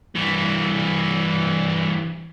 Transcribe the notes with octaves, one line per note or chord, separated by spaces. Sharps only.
G2 E3